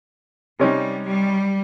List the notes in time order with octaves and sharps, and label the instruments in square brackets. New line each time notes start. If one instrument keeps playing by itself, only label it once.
[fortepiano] C3 C#4 D#4 [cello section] G3
[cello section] G3